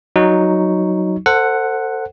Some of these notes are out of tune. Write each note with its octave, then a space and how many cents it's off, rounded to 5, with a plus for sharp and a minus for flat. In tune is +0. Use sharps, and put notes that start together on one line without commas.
F#3 +0 D#4 +0 C#6 +0
A4 +30 C5 +0 F#5 +0